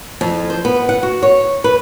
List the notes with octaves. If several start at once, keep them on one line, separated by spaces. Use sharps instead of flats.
F2
C5
B3
F#5
F#4
C#5
B4